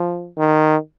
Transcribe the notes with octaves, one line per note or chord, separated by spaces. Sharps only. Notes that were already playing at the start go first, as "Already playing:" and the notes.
Already playing: F3
D#3